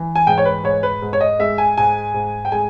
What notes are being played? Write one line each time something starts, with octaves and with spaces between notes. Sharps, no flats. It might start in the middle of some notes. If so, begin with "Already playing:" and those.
Already playing: E3
G#5
G#2 G5
C#5
B4
G#2 C#5
B4
G#2
C#5
D#5
G#3 E5
G#5
G#2 G#5
G#2
G5
G#3 G#5